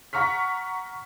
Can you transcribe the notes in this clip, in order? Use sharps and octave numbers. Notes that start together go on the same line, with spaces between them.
F#5 A#5 C#6 F6 B6